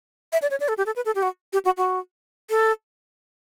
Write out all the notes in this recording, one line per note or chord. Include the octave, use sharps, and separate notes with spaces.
E5
D5
C#5
D5
A4
G4
A4
B4
A4
G4
F#4
G4
F#4
F#4
A4